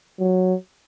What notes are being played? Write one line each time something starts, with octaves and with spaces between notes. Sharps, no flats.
F#3